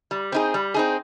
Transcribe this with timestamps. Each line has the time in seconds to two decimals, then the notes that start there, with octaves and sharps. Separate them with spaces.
0.11 G3
0.32 C4 D#4 G#4
0.54 G3
0.74 C4 D#4 G#4